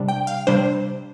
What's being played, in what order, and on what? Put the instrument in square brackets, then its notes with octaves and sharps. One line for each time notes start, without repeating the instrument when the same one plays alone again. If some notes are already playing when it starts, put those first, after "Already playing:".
Already playing: [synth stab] C3 G3 D4
G5
F5
C3 G3 D4 C5